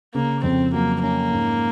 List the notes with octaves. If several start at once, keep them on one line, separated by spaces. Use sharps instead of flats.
C#3 A#3
F2 C4
F#3 A#3
A#3 C#4
G#2